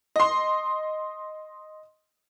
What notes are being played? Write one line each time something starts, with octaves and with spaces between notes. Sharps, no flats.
D#5 C6